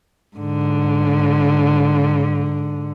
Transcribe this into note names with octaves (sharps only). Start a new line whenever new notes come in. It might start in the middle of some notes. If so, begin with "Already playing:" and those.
G#2 D3